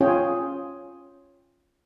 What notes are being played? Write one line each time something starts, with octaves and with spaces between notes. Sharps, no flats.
C#4 F4 G#4 C#5 G5